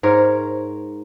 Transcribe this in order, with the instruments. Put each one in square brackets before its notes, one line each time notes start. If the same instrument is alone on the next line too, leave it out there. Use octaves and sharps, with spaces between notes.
[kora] G#2 A#4 C#5